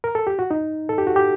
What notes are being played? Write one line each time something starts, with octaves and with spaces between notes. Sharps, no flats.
A#4
A4
G4
F#4
D#4
A4
G4
F#4
G4